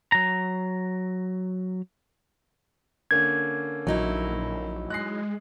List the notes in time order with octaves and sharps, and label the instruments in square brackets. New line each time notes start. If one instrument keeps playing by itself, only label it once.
[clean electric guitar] F#3 A#5
[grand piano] D3 A#3 C#4 [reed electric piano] G#6
[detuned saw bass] A#1 [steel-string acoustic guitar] F#3 D#4 E4
[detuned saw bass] G#3 [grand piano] F#6 A#6 C7